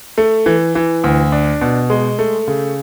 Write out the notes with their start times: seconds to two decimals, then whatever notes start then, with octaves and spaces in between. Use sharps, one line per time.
0.18 A3
0.46 E3
0.75 E3
1.04 D2
1.32 D4
1.61 B2
1.90 G#3
2.19 A3
2.48 C#3